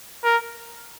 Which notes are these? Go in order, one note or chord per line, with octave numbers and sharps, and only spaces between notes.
A#4